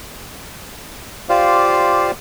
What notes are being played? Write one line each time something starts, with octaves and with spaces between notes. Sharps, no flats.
F4 G4 C5 D5 F5